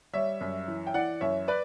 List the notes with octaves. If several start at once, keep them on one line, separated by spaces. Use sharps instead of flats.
G3 C#5 E5
F#2
E3
G5
E3 D5 F#5
F#2 C#5 E5
B4 D5